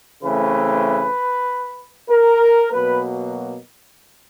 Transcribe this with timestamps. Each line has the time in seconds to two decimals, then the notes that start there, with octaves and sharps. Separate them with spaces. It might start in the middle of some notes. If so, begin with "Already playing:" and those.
0.23 C#3 E3 A3 C4 B4
2.10 A#4
2.72 B2 F#3 A#3 B4